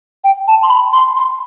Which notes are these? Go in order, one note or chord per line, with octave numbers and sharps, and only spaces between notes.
G5
A5
C6
B5
C6
C6